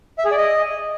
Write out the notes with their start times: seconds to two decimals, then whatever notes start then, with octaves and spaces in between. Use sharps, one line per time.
0.18 E5
0.25 G#4
0.31 D5
0.38 D#5